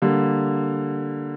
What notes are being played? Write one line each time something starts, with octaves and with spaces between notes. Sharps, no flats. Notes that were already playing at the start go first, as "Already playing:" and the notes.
D3 G3 A#3